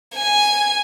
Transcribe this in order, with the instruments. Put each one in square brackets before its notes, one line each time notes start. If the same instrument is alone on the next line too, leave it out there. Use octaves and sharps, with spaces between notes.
[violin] G#5